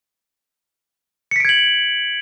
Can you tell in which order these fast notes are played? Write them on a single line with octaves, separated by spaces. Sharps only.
C#7 B6 D7 G#6 F#7